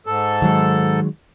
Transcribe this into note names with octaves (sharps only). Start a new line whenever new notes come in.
G#2 A4
D#3 F#3 G#3